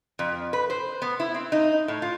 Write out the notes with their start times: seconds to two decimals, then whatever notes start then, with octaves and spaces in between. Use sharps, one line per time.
0.19 F2
0.53 B4
0.70 C5
1.02 B3
1.20 E4
1.34 C4
1.52 D#4
1.88 A2
2.02 F4